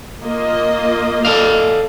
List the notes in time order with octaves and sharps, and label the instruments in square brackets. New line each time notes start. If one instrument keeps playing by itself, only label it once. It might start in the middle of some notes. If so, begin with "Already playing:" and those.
[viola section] A#3 F4 D#5
[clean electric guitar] A4 D5 F5